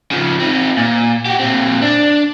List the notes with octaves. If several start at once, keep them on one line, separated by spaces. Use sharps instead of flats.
C#3 F3
C4 D#4
A#2
F#4 G4
A#2 C4
D4